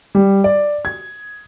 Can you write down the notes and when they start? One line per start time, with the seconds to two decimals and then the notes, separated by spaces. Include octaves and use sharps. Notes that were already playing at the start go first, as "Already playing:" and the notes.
0.15 G3
0.44 D5
0.85 G#6